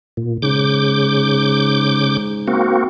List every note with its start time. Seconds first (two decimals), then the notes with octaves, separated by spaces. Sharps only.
0.17 A#2
0.42 G#2 C#3 D6 G6
2.48 A#3 C4 F#4